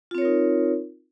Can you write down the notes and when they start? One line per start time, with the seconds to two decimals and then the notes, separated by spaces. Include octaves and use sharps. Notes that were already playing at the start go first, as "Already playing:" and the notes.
0.11 F4
0.15 C4
0.18 C#5
0.22 A#4
0.25 D#4